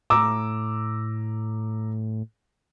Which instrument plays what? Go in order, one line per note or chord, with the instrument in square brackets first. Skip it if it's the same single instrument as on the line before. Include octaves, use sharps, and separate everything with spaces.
[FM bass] A2 [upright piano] A#5 D6 E6